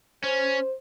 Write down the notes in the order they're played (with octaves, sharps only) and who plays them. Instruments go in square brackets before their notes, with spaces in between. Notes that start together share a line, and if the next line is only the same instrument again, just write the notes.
[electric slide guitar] C#4 [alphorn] C5